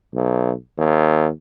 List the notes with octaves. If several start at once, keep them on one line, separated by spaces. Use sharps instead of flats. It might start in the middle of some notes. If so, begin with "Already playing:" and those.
B1
D#2